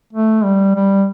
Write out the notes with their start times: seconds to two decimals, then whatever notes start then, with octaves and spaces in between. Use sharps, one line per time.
0.13 A3
0.44 G3
0.76 G3